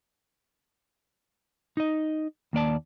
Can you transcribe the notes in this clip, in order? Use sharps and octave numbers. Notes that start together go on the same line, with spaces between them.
D#4 D#5
D#2 A#3 D5 A5